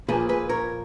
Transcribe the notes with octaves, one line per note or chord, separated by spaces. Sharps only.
A#2 F3 A#3 G#4 B4
G#4 B4
A#4 C#5